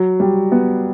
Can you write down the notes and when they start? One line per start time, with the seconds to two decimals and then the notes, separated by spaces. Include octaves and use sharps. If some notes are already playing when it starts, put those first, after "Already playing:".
Already playing: F#3
0.20 G3
0.52 B3